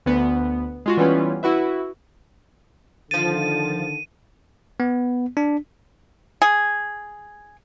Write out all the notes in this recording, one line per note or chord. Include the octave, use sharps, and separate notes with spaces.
D2 B3
G#3 F4 F#4
E3 G3 B3 C#4 F4 B4
E4 F#4 B4 E5
D3 D#3 F3 A6 D#7
B3
D4
G#4